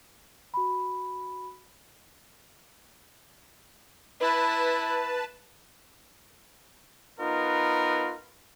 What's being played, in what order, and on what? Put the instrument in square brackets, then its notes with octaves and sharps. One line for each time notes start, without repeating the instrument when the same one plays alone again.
[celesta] F#4 B5
[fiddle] E4 [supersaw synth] B4 A5
[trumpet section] B3 D#4 F4 A#4 B4